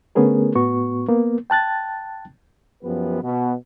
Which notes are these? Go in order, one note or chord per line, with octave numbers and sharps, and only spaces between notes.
D3 A3 B3 C#4 G#4 A#4
A2 B3 F#4 C#6
A#3 B3
G5 A5 F#6 A6
F#2 F3 B3 G4 B4
B2